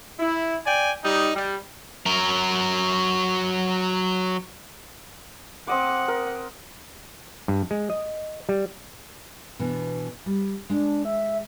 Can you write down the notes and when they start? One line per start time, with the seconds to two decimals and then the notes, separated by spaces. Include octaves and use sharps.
0.20 E4
0.67 D5 G5 G#5
1.03 G3 D#4
1.35 G3
2.06 F#3 A#4
5.67 C4 D#5 F#5 D6
6.08 A#4
7.48 G2
7.71 G#3
7.90 D#5
8.49 G3
9.59 B2 E3 D4
10.26 G3
10.70 G#3 D4
11.05 E5